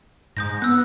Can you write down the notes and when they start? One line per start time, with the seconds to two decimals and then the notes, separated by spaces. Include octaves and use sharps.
0.37 G#2 D#6 G6 A#6
0.62 B3 E6 F#6